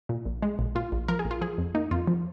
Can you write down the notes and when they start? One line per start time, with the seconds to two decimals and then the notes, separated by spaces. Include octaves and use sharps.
0.09 A#2
0.25 A#1
0.42 G#3
0.59 A#1
0.75 A#2 F4
0.92 A#1
1.08 F3 A#4
1.19 G#4
1.25 A#1
1.31 F4
1.41 F3 G#4
1.58 F2
1.75 A#3 D#4
1.91 F2 F4
2.07 F3